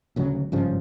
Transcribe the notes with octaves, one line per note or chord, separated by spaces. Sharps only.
D#1 D2 C#3 F#3
G#1 G2 C#3 F3